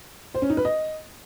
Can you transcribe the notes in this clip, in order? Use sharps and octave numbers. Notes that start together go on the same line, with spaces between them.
C5
C#4
D#4
B4
D#5